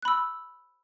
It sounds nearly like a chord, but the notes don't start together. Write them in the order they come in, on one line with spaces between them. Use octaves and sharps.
F#6 B5 E6